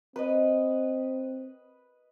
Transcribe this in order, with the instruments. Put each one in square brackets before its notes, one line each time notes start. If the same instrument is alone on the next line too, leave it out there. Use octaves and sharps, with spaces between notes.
[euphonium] C4 [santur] B4 D#5